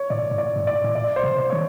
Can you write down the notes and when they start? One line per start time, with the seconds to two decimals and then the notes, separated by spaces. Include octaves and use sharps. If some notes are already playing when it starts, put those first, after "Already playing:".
Already playing: C#5
0.10 A2 D5
0.31 G#2
0.38 A2 D5
0.56 G#2
0.67 A2 D5
0.84 A2
0.95 A#2 D5
1.16 C5
1.23 C3
1.38 C5
1.50 D#3 C#5